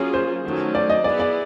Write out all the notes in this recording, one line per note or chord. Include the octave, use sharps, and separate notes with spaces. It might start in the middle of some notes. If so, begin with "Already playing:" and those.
Already playing: F#3 A#3 C#4 F4 G#4
C5
D#3 F#3 A3 C#4
D5
D#5
B3 E4 G#4 D5
D5